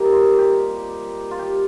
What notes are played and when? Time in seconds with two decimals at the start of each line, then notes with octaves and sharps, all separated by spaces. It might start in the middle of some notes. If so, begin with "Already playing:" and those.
Already playing: C3 G3 A#3 D#4 A#4
0.13 F4
0.38 G4
1.31 F4
1.39 G4